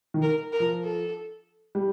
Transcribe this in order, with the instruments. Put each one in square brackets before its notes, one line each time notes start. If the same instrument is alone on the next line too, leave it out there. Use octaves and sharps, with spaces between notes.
[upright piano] D#3
[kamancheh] A#4
A#4
[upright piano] F3
[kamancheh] A4
[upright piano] G3